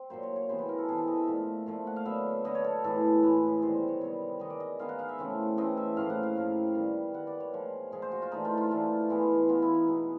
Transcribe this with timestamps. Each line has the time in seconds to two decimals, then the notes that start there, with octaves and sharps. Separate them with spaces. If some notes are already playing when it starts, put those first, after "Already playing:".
Already playing: C4
0.10 A#2 F#3 A#3 C5
0.23 C#5
0.36 C#5
0.49 C3 E3 G#3 B3 C5
0.59 B4
0.69 A#4
0.78 A4
0.88 C3 E3 G#3 B3 G#4
0.98 A4
1.08 D#5
1.17 E5
1.27 A#2 F3 A3
1.66 A#2 F3 A3
1.87 F#5
1.96 F5
2.05 D3 F#3 B3 E5
2.45 D3 F#3 B3 D#5
2.55 C#5
2.64 A4
2.84 A2 E3 G#3 B3 A4
3.23 A2 E3 G#3 B3 B4
3.62 C3 D#3 G3 B3 C5
3.75 C5
3.88 C#5
4.01 C3 D#3 G3 B3 C#5
4.40 D#3 G#3 B3 D#4 D#5
4.50 D5
4.60 D#5
4.79 D#3 G#3 B3 D#4 F5
4.89 F#5
4.99 F5
5.09 E5
5.19 C#3 E3 A3 C4
5.57 C#3 E3 A3 C4 D#5
5.77 E5
5.97 A2 F3 A#3 F5
6.10 F#5
6.23 F5
6.36 A2 F3 A#3
6.75 D#3 G3 B3
7.14 D#3 G3 B3 F#5
7.27 D5
7.40 C#5
7.53 A#2 F3 G#3
7.92 A#2 F3 G#3 G#4
8.02 C5
8.12 F#4
8.22 F4
8.31 E3 A3 D4 D#4
8.45 F4
8.57 F4
8.71 E3 A3 D4
9.10 E3 G#3 B3
9.49 E3 G#3 B3 F4
9.62 E4
9.75 D#4
9.88 B2 G#3 B3